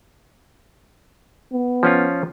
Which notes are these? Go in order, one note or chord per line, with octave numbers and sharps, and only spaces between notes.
B3
F3 C#4 F4